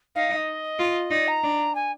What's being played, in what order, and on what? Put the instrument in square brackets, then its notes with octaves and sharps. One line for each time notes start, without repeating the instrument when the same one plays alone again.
[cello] D#4 [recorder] F5
[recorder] F5
D#5
[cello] F4
[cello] D#4 [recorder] D5
[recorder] A#5
[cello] D4
[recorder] G#5